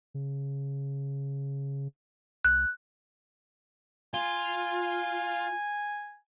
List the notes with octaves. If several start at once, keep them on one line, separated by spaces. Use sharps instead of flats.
C#3
C2 F#6
F4 G#5